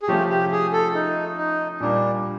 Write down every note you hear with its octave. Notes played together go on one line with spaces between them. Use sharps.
G#4
C3 F3 A3 C#4 F4 G4
G4
G#4
A4
D#4
D#4
A#2 G3 A#3 D4